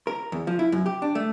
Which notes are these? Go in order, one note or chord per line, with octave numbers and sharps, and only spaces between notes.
A#4
E2
F3
E4
F#2
G4
D4
A3